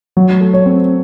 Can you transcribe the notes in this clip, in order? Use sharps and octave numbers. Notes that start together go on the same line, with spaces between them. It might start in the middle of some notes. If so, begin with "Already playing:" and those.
F#3
A3
C#5
C4